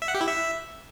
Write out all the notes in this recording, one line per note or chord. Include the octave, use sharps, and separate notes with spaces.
E5
F#5
G4
E4
E5